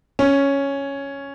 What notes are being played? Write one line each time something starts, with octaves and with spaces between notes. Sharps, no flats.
C#4